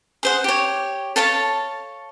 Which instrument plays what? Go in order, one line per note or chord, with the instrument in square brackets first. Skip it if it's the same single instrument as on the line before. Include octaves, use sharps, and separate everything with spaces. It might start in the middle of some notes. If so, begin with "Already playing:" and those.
[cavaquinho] G#4 C5 F#5
G4 C#5
A4 C#5 F5 A5